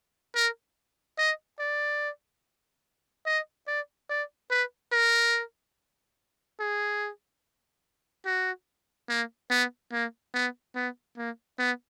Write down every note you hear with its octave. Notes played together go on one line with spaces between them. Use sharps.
A#4
D#5
D5
D#5
D5
D5
B4
A#4
G#4
F#4
A#3
B3
A#3
B3
B3
A#3
B3